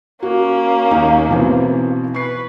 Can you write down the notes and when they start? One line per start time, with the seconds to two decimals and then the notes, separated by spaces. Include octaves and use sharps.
0.23 A#3 C#4 F#4
0.91 D#2 D#4 F5
1.29 B2 E3 C4
2.14 B4 C#6 C7